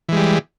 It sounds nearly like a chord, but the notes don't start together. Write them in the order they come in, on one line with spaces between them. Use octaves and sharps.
E3 G#3 G3